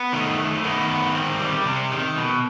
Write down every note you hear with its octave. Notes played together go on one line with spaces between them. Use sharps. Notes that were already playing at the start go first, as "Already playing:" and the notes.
Already playing: B3
D#3 A3 D#4
A3
D#3 B3 D#4
B3
C4
G3
C3
D#3
B2